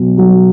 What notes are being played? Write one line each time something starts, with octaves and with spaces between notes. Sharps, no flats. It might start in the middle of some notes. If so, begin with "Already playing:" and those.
Already playing: B2 F#3
F#3